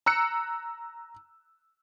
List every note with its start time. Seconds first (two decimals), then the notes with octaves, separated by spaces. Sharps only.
0.06 A#5 E6 F#6 C#7